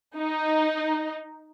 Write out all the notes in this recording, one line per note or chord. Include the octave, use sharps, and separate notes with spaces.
D#4